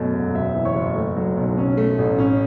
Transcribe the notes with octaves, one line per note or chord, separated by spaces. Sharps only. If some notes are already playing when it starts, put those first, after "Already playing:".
Already playing: F#2 B2 A3
E1
F#1 E5 E6
E3
C#5 C#6
F#1
A3
F#3
B1
C#4
A3
A1
C#4